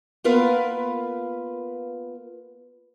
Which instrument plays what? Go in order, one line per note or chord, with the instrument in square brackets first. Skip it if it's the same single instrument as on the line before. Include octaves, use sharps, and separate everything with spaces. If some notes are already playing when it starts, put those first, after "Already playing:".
[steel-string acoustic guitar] A#3 B3 F4 A#4 B4 F5